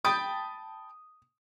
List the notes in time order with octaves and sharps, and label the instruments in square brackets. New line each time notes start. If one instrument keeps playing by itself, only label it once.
[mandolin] G5 A5 B5 [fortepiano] D#6